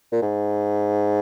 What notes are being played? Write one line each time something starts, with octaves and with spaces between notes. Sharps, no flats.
A#2
G#2